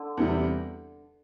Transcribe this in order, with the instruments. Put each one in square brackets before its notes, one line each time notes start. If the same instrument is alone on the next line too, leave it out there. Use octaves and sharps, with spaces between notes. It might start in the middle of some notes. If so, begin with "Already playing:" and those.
Already playing: [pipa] D3
[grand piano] E2 C3 G3